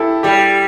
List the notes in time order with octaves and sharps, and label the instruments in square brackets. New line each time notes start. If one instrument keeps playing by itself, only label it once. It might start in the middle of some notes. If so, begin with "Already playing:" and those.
Already playing: [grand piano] E4 G4 A4
[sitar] G3 [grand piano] G4